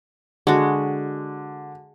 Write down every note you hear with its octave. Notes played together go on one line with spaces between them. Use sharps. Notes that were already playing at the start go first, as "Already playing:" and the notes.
D3 G#3 F#4